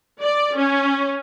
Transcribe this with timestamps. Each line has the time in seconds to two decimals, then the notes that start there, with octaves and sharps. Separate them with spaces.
0.22 D5
0.57 C#4